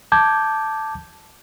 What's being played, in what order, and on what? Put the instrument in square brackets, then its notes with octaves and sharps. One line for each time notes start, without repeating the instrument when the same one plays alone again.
[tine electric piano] A5 D6 G6 G#6